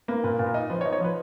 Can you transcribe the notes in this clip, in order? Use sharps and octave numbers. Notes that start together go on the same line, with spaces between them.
A#3 B4
A#2 B4
A#2
A#4
D#4
F3 B4
C#5
D#4
C#5
F3 B4